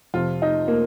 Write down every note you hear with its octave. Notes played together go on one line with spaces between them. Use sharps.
F2 C3 F3 F4
D#4
A#3